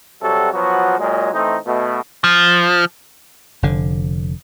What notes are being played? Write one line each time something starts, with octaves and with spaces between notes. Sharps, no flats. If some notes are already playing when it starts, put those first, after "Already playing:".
C3 F#3 G3 F#4 A4
F3 F#3 B3 F#4
A#2 F#3 G#3
E3 A3 C4 D#4
B2 A3
F3
F1 D3